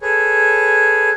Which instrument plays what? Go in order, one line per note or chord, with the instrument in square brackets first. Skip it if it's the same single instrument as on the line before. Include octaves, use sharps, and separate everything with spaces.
[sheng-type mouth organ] G#4 A4 B4 C#5